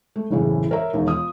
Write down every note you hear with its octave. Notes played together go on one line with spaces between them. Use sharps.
A3
F#1 E2 A2 C#3 E3
A#4 C#5 E5 A#5
E1 D#2
F4 D#6